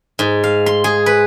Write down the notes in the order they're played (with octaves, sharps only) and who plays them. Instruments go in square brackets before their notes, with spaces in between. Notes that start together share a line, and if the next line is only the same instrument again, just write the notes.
[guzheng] G#2
F5
C6
G#4
B4